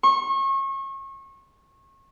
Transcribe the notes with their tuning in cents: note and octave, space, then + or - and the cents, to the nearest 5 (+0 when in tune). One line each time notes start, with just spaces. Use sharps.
C#6 -35